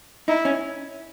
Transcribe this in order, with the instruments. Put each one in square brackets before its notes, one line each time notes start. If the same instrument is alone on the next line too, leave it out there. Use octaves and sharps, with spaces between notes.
[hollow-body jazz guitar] D#4 [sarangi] E4
[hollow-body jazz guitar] C#4